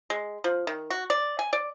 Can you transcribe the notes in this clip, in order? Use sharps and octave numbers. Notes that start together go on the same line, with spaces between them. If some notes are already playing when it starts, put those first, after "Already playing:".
G#3
F3
D#3
F#4
D5
G#5
D5